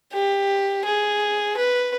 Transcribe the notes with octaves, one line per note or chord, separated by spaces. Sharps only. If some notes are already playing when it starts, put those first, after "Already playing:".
G4
G#4
B4